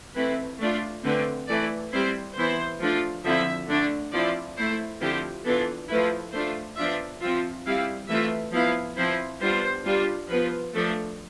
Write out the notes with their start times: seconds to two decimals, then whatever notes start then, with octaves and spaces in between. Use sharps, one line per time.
0.16 E3 A3 C4 E4 B4
0.60 A3 D4 F4 D5
1.04 D3 A3 C4 B4
1.48 E3 A3 E4 D5
1.93 G3 C4 E4 C5
2.36 E3 B3 E4 C5
2.81 F3 A3 D4 F4
3.25 D3 F3 C4 E4 E5
3.68 D3 A3 D4
4.12 F3 C4 E4 D5
4.57 A3 E4 C5
5.01 D3 F3 C4 E4 G4
5.45 E3 B3 D4 F4 A4
5.89 F3 A3 E4 B4
6.33 A3 D4 F4 C5
6.77 F3 B3 D4 F4 E5
7.21 F3 C4 F4 E5
7.65 G3 C4 E4 F5
8.09 E3 A3 C4 F4 E5
8.53 F3 B3 E4 F5
8.97 F3 C4 E4 C5
9.41 G3 B3 D4 F4 C5
9.86 G3 D4 F4
10.30 F3 B3 F4 B4
10.74 F3 A3 D4 A4